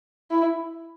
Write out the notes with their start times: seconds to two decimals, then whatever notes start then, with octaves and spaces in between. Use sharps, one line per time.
0.31 E4